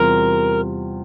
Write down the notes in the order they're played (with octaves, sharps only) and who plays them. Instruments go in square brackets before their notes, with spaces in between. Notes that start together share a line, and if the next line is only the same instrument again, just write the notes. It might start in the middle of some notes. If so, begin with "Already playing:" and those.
Already playing: [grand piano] E2 C3 G3 C4 F4 [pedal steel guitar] A#4